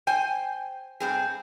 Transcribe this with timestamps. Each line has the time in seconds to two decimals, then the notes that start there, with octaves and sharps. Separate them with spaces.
0.07 C5 G5 G#5
1.00 G2 C4 G#4